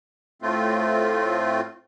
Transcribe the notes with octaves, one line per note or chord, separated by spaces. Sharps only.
A2 A3 C4 F4